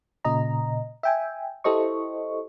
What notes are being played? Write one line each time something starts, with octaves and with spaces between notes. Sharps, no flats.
A#2 C#3 D#5 A#5
E5 G5 G#5
E4 G4 A4 C5 D#5 C#6